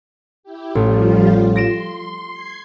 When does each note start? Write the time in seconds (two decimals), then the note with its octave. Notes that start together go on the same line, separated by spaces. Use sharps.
0.43 E4 G4
0.75 A1 F3 G3 F4
1.56 C6 A#6 D7 E7
2.30 G#6 C7